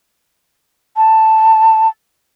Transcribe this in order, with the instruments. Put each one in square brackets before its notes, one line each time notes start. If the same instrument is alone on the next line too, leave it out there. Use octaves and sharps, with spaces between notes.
[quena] A5